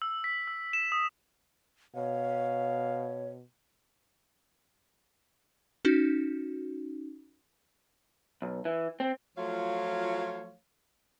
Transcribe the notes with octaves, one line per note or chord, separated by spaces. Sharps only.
E6
B6
E6
E7
D#6
B2 C#5 F5
C#4 D#4 F#4
B1
E3
C4
F3 F#3 A3 F4 C#5 F5